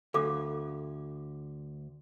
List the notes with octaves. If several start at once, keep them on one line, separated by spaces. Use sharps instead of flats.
D2 A4 F5 D6